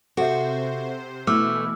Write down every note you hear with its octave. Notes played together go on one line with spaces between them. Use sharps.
C3 F#4 A4 C5 E5
B2 E3 A3 E4 D6 E6 F6